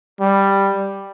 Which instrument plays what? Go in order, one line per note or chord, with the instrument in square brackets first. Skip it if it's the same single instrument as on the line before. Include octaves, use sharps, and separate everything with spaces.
[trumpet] G3